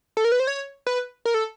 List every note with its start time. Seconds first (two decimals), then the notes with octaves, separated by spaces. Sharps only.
0.17 A4
0.25 A#4
0.32 B4
0.40 C5
0.47 C#5
0.87 B4
1.25 A#4
1.34 A4